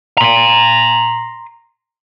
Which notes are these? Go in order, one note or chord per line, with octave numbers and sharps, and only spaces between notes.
A#5 C6